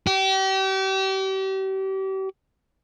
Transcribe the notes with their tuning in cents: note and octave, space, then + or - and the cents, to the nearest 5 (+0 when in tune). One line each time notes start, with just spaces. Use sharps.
G4 -35